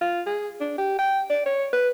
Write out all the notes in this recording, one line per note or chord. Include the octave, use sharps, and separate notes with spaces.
F4
G#4
D4
G4
G5
D5
C#5
B4